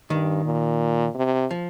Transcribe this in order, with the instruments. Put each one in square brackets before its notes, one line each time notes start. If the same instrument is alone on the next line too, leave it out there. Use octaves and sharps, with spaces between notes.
[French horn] G2 [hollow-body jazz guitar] D#3
[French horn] A#2
C3
[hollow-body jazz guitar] F3